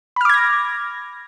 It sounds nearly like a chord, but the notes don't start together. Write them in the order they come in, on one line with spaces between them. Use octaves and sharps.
B5 F6 D6 G#6 A#6